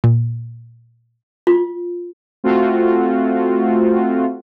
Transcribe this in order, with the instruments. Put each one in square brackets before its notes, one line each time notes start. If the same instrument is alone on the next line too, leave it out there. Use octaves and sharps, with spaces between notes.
[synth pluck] A#2
[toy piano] F4
[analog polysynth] A3 C4 F4 F#4